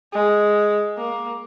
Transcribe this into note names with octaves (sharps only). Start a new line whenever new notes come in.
G#3
A#3